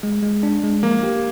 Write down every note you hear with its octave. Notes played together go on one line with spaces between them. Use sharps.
G#3
G#3
D4
G#3
F3 A#3
G4